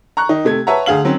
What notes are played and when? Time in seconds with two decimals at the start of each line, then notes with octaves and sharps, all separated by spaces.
0.17 A#5 C#6 F#6
0.29 D#3 D#4
0.45 C3 A3 G#6
0.67 B4 C#5 E5 F#5 A5 A#5
0.86 D2 G#4 F5 F#7
1.04 D#3 F#3 C4 C#4